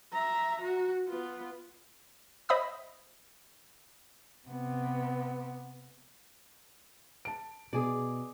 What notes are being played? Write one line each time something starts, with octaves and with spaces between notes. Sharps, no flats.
E5 A#5
F#4
B3 F4
C5 D#5 E5 B5 D#6 E6
C3 B3
A5 D7
B2 G#4 D5